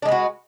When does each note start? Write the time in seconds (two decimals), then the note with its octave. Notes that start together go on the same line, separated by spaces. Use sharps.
0.02 D4
0.05 G#3
0.08 B4
0.11 F#4